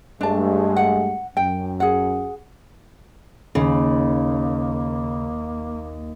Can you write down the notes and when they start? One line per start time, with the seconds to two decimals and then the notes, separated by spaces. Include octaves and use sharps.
0.21 G2 G#3 A3 D4 A5
0.76 F#5
1.37 F#2 G5
1.80 G#4 F#5
3.55 D#2 C#3 A#3